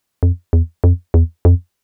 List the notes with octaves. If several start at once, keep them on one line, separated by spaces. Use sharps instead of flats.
F2
E2
F2
E2
F2